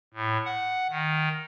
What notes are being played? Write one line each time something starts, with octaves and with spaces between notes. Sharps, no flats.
A2
F#5
D#3